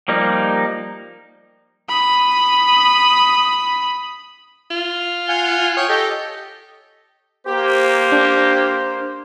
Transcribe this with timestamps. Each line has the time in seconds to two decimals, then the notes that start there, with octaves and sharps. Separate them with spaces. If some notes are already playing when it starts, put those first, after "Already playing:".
0.08 F3 G3 A#3 D#4
1.89 B5 D#6
4.71 F4
5.29 F5 F#5 G#5
5.77 C#5 G5 C#6 D#6
5.89 G4 A4 D#5 G5
7.47 A#3 G4 C5
8.12 D4